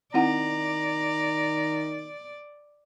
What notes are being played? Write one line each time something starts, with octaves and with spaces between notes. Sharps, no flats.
D#3 C4 E4 D5 F#5 A#5